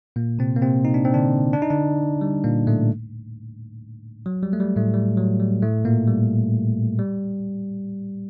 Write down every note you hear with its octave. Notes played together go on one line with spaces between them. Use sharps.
A#2 A#3
C3 C4
A#3
C3 C4
D#4
D4
C4
D3 D4
D4
D#4
D3 D4
G3
A#2 A#3
A2 A3
F#3
G3
A3
G3
A2 A3
G3
F#3
G3
A2 A3
A#2 A#3
G3
G3